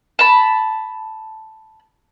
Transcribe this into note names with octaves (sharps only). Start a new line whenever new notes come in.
A5 B5